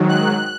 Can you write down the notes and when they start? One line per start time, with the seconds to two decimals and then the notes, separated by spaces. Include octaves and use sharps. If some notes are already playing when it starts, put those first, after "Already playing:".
Already playing: G#2 D#3 F#3
0.09 F#6